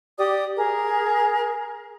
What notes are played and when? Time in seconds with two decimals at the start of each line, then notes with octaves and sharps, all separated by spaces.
0.18 G4 D5 D#6
0.55 G#4 A#4